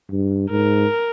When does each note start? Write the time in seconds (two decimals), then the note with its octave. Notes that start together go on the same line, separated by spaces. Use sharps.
0.10 G2
0.50 G#2 A#4